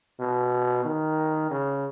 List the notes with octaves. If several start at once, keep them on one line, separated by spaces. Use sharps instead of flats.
B2
D#3
C#3